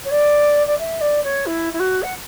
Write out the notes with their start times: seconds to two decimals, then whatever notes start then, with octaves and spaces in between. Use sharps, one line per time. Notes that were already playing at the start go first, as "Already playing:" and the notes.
0.05 C#5
0.11 D5
0.66 D5
0.78 E5
1.01 D5
1.23 C#5
1.46 E4
1.73 E4
1.79 F#4
2.02 F#5